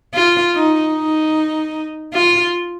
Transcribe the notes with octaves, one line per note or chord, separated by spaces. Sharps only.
F4
D#4
D#4
F4